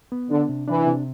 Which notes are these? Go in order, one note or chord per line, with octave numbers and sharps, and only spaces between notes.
B3
D3 D4
C3
E3 D4
C3